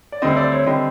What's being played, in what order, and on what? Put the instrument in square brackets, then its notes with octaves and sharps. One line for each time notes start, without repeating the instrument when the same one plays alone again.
[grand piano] D5
D2 D3 G3 C4 D#5
D5
C#5
D3 G3 C4 D#5